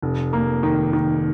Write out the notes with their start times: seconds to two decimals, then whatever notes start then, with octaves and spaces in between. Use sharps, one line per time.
0.02 F1
0.33 A#3
0.63 D#3
0.93 D#3